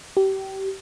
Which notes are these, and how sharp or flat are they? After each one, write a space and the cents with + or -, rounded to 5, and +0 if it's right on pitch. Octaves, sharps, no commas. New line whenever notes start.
G4 -25